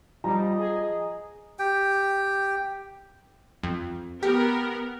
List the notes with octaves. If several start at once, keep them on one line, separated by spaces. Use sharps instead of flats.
F3 G3 D#5 A#5
G#4
G4 G5
F2
B3 G4 A#4